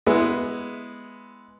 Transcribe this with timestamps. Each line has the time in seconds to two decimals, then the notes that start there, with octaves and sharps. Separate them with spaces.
0.06 G#3 B3 E4